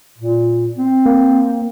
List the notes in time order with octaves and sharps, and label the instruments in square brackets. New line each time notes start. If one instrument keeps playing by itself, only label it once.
[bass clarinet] A#2
C4
[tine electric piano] A#3